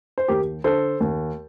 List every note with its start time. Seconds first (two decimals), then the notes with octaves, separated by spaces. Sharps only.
0.18 C5
0.28 D#2 G4 A#4
0.64 D3 A4 C5
1.00 D#2